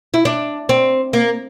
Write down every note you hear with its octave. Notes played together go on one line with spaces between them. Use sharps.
E4
D4
C4
A#3